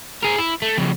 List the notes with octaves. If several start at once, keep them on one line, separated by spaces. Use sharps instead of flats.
G#4 A#4
E4
A3
F2 C#3